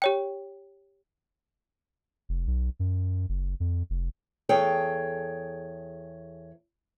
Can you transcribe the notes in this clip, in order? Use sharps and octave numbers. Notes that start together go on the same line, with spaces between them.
G4 C#5 G5
F1
B1
F#2
F#1
F2
F1
E2 G#4 A4 C#5 G5